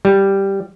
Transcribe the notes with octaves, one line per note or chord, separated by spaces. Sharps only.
G3